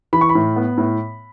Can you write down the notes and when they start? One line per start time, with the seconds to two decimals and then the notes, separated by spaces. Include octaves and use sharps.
0.13 E3 B5
0.21 C#6
0.29 B5
0.35 A2
0.56 B3
0.78 A2